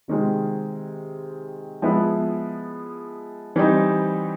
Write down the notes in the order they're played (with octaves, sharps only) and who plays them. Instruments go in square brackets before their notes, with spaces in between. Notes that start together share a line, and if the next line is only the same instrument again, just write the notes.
[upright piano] C3 D#3 G#3 C4
F3 G#3 B3 E4
E3 G3 C4 D#4